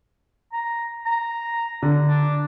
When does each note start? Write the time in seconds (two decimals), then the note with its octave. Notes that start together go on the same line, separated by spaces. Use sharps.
0.53 A#5
1.06 A#5
1.83 D3
2.07 D4